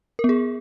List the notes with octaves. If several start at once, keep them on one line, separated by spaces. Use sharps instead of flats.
A#4
B3
G#4